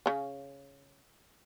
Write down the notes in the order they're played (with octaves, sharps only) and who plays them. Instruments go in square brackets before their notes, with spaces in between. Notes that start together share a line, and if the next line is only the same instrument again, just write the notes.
[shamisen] C#3 C#4